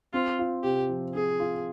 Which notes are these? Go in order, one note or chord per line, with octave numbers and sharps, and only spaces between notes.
C4 F4
F4
C3 G4
F3
C4 G#4
F4